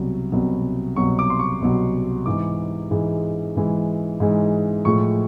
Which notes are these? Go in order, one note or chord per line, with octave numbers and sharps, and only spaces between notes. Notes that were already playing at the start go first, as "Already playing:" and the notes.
Already playing: C2 B2 F#3
C2 B2 F#3
C2 B2 F#3 C#6
D6
C6
C#6
C2 B2 F#3
G#2 E3 G#3 D6
G#2 E3 G#3
G#2 E3 G#3
G#2 E3 G#3
A2 F3 G#3 C#6